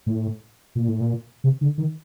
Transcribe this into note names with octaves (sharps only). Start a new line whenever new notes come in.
A2
A#2
A2
A#2
C3
D3
D#3